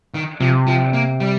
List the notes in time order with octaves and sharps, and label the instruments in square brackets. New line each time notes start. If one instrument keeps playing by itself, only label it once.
[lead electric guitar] D#3
[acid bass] C3 [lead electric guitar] F3
[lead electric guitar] F3
A#3
G3